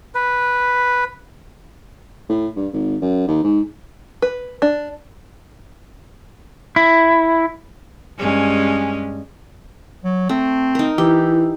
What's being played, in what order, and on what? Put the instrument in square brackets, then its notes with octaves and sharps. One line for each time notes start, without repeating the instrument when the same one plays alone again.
[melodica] B4
[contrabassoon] A2
G2
G#1
F#2
D#2
G#2
[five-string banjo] B4
D4
[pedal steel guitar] E4
[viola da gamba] G2 G#3 C#4
[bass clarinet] F#3
[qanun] A3 [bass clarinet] C4
[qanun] D#4 A#4
[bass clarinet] E3 [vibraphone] E4 [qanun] G4